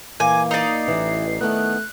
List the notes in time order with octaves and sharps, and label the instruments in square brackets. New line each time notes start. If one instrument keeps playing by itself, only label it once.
[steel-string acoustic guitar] A#2 A#3 [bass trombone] E3 [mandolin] G#5 [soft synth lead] D6
[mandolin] D#4 D5 [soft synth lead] C7
[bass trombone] A1 [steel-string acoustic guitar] E3
[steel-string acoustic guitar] D#3 B3 [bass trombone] A3 [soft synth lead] F#6